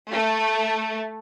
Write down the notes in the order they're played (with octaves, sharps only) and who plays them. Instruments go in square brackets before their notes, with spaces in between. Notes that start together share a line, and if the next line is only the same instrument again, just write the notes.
[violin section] A3